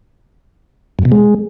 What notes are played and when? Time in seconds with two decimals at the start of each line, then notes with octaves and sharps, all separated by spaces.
0.99 F#2
1.05 B2
1.12 G#3